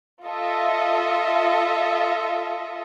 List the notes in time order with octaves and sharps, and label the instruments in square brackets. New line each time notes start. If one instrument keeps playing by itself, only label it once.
[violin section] F4 A4 D#5 E5